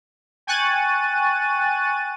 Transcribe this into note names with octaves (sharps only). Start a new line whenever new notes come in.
G5 G#5 C#6 F#6 A6 D#7